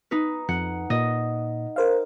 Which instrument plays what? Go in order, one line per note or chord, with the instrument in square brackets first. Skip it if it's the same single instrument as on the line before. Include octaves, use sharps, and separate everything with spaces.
[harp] D#4 B4
[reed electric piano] F2 [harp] F#5
[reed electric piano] A#2 [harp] D#5
[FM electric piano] A#4 C5 F5